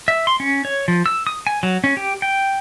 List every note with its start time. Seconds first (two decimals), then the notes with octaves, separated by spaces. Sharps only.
0.08 E5
0.27 C6
0.40 C#4
0.65 C#5
0.88 F3
1.06 E6
1.27 D#6
1.47 G#5
1.63 F#3
1.84 C#4
1.97 G4
2.22 G5